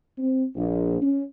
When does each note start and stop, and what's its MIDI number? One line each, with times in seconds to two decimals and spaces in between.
0.18 0.45 60
0.56 0.98 34
1.02 1.24 61